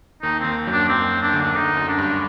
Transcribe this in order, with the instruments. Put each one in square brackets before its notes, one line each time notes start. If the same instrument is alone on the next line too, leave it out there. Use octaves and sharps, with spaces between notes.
[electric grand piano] D#2 D#3 [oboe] D#4
[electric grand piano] D#2 D#3 [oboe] C4
[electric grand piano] F#2 F#3
[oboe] D4
[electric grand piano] F#2 F#3 [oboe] C4
[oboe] D4
[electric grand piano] D2 D3
[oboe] D4
[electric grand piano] D2 D3 [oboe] D#4
[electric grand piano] F#2
[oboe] D4
[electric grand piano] G2